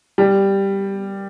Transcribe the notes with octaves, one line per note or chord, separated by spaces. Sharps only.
G3